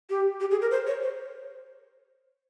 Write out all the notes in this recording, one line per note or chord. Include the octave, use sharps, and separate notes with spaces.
G4
G4
G#4
A#4
C5
C#5
C5